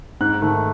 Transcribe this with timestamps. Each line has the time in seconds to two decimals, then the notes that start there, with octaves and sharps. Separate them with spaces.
0.21 G#2 F#6
0.42 D#3 A3